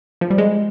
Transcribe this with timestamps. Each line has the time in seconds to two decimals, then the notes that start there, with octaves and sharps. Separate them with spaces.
0.21 F3
0.30 G3
0.38 G#3